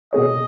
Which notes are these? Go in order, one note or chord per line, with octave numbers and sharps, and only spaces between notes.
B2 B3 G#4 C#5 D#5